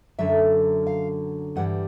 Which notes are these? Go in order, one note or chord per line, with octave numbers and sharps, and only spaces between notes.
F#2 D3 F#3 E5
F5
G2 E3 G3 F#5